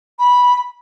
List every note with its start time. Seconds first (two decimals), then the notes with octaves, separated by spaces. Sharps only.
0.19 B5